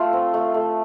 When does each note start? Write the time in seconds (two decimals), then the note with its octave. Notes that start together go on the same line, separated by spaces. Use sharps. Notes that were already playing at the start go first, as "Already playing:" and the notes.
Already playing: A3 F4
0.13 C4
0.34 A3
0.54 A3